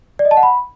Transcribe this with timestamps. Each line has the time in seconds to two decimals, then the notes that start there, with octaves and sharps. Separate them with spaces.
0.19 D5
0.25 D#5
0.31 A5
0.37 F#5
0.43 B5